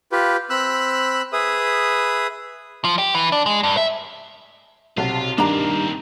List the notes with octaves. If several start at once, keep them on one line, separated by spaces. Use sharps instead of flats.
F4 G4 B4
C4 B5 E6 F#6
G#4 B4 E5 D#6
F3
G4
E3
D4
G#3
G2
E5
B1 C3 F4 F#4 A5
G2 D#3 A#3 C4 D4 A#5